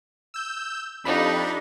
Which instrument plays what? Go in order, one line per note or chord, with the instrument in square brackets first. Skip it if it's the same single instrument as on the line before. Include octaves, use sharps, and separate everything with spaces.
[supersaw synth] E6 G6
[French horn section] F2 [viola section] D4 G4 [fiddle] D#4 [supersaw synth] B5